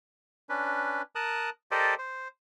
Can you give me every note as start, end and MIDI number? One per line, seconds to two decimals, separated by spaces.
0.49 1.02 61
0.49 1.02 62
0.49 1.02 71
1.15 1.50 70
1.15 1.50 81
1.15 1.50 87
1.15 1.50 90
1.71 1.94 67
1.71 1.94 69
1.71 1.94 70
1.71 1.94 72
1.71 1.94 74
1.71 1.94 75
1.98 2.28 72